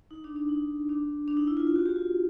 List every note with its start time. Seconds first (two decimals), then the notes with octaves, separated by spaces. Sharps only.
0.11 D#4
0.24 D4
0.36 D4
0.49 D#4
0.89 D4
1.28 D4
1.37 D#4
1.47 E4
1.57 F4
1.67 F4
1.76 F#4
1.86 G4
1.96 F#4